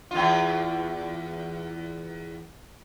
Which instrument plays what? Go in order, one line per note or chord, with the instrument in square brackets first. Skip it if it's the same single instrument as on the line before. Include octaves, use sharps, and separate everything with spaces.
[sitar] E2 F4